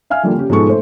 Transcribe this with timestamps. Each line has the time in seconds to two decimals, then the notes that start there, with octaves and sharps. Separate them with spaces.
0.10 E5 F5 G#5 F6
0.23 D3 F3 G3 A#3
0.35 C#3 G4
0.50 G#2 B2 F3 G#3 A4 C#6
0.67 A3 C5